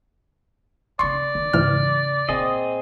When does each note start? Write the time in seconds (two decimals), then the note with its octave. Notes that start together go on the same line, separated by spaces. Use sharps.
0.99 C#3 C4 D5 C6 C#6
1.35 D#3
1.53 E2 G#2 C#3 E3 F6
2.29 A#2 C4 G#4 D#5